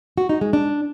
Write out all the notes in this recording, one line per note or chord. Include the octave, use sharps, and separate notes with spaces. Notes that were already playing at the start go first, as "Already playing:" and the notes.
F#4
D#4
G#3
D4